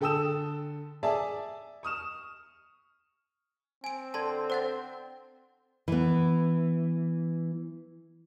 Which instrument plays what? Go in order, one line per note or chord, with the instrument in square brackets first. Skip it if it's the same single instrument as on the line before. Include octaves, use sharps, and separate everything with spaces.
[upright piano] D3 A4 G5 D#6 E6 E7
G#4 D5 E5 G#5 A5
C#6 D#6 F6 E7
[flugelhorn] C4 [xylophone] G#5 D7
[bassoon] D3 [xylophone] A5 C6 G#6
[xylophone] C5 F#5 A6
[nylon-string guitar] E3 B3